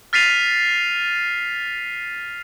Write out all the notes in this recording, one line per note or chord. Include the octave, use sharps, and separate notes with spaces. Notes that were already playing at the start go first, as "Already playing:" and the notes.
F6 A6 B6 C7 D#7 F7